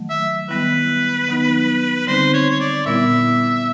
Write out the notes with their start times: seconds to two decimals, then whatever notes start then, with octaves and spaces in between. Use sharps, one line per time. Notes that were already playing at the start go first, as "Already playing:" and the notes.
Already playing: D#3 F#3 A3
0.10 E5
0.49 D#3 G3 B3 E4 B4
1.28 D#3 F#3 B3 D#4
2.07 D3 G3 C4 D#4 C5
2.34 C#5
2.50 C#5
2.60 D5
2.86 A#2 G3 B3 E4 E5